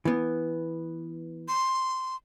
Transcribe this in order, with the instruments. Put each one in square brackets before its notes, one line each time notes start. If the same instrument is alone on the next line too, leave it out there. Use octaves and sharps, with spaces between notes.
[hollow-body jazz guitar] E3 B3
[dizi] C6